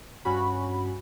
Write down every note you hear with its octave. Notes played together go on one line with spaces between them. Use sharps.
G2 C#4 F#4 B5